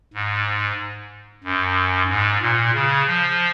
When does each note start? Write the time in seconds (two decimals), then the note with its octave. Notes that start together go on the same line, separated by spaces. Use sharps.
0.14 G#2
1.44 F#2
2.09 G#2
2.41 A#2
2.74 C#3
3.07 F3